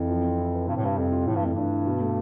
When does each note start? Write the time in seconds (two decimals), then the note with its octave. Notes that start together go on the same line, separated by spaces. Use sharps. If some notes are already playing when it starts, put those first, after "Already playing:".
Already playing: F2 E3
0.09 F3
0.24 C4
0.38 E4
0.54 B4
0.68 G2 C3
0.76 A2
0.83 G2 G3
0.97 F2 C4
1.12 F4
1.27 A2 E3
1.36 G2
1.41 F2 A3
1.54 G2 D4
1.72 E3
1.86 B2
2.00 A3